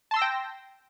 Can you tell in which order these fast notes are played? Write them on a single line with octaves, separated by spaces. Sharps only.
A5 C6 E6 A#6 G5